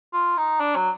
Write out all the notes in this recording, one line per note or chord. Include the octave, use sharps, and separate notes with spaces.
F4
D#4
D4
F#3